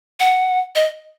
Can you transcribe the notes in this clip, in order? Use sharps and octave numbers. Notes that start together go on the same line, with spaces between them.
F#5
D#5